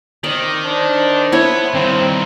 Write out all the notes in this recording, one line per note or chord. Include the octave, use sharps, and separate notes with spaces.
D#3 C4 D5
D4 C5
E4 C#5 F#5 B5
G2 D#3 C4